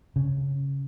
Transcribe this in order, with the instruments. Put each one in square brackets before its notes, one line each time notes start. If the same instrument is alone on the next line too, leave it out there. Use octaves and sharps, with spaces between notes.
[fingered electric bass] C#3